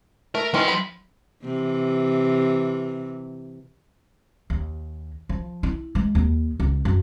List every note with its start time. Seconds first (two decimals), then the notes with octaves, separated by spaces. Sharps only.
0.35 A3 A#4
0.54 D#3 E3 F#3 C#4 C6
0.68 B5
1.44 C3 E3
4.50 D#2
5.29 F3
5.63 E4
5.95 G#3
6.15 D#2
6.60 C#2
6.85 F#2